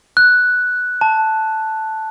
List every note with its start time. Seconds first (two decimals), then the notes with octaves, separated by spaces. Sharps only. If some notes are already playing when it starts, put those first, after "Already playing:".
0.17 F#6
1.01 A5